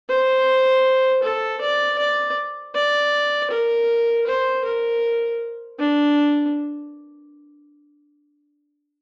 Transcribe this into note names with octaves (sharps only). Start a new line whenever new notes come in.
C5
A4
D5
D5
D5
A#4
C5
A#4
D4